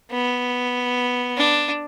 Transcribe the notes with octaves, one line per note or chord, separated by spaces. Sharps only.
B3
D4